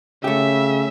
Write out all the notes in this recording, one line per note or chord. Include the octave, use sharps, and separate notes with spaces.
C#3 A3 G4 E5